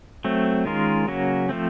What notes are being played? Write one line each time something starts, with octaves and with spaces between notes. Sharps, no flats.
F#3 A3 C4
D#3 G#3 C#4 F4 A#4
C#3 F#3 A#3 C#4 F#4
F3 A3 C4